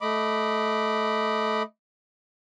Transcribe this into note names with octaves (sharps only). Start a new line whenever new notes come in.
A3 D#5 B5 D6